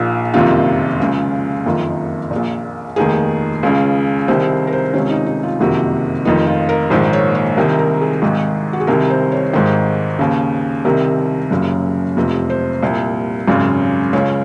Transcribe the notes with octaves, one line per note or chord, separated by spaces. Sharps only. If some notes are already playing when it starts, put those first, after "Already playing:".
Already playing: A#1 A#2 D#4
F#1 F2 C3 D#3 F4
C#2 C#3
F#1 F2 D#3
A#2
A#1
F1 D#2 D#3 G#4
C#2 C#3
C2 C3 D#3 C5
A#4
C5
C#2 C3 D#3 C#4
D#4
D#4
F4
F#1 F2 C3 D#3 F#4
F1 F2 D#3 D#4
F4
A#4
A#1 G#2 D#3 C5
C#5
C#5
C2 C3 D#3 A#4
A#4
G#4
G#1 G#2 D#3
F#4
G#4
C2 C3 D#3 A#4
C5
C#5
G#1 G#2 D#3 C5
D#2 C#3
C2 C3 D#3 A#4
F#1 F#2 C#3
F1 F2 C3
C5
C2 A#2
G#1 F#2 C#3
C#2 C#3 C#5